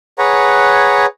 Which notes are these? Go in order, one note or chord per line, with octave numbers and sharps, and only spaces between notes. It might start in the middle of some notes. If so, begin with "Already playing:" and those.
G#4 B4 C#5 F#5 A#5